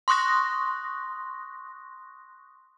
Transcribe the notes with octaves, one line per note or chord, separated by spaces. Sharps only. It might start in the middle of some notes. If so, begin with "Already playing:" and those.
C6 C#6 D#6 F#6 A#6